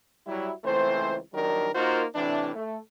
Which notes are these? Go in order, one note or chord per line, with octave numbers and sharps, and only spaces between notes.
F#3 G3 E4
C#2 E3 A3 C4 C5
A#1 D#3 F#3 G3 D4 A#4
A#3 D#4 F4 F#4 A#4 C5
A2 C3 E3 D4
A3